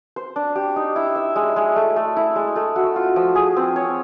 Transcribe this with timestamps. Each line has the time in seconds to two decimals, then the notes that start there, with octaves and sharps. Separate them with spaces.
0.16 C5
0.36 D4
0.56 G4
0.76 D#4
0.96 E4
1.15 E5
1.36 G#3
1.56 G#3
1.76 A3
1.96 A3
2.16 E4
2.36 G#3
2.56 A3
2.76 F#4
2.96 F4
3.16 F3
3.35 G#4
3.57 C4
3.76 C#5